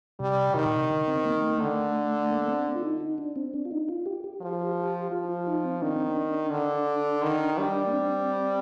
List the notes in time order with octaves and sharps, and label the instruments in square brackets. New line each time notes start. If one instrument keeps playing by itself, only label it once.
[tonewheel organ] C3 [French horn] G3
[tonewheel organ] C3 [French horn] D#3
[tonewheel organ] A#2
C3
D3
C4
A#3
A3
A#3
[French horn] D3 [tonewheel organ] A3
[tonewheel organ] A#3
C4
F4
D#4
D#4
D4
C4
D4
F4
D#4
F4
G4
G4
[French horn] F3 [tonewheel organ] G4
[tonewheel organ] G4
G4
[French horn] F3 [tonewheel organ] F4
[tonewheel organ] F4
D#4
C4
[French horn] D#3 [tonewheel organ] D4
[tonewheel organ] C4
D4
[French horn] D3
D#3
G3
[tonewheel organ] A#3
C4